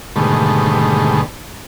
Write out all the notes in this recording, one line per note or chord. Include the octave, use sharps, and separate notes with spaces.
G#2 B2 D3 D#3 G3 A3